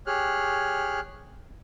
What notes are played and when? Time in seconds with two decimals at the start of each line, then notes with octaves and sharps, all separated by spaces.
0.07 G4 G#4 C#5 F6 F#6